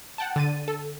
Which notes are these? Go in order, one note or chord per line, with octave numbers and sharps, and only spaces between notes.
F#5 G5 A5
D3 A6 D#7
A4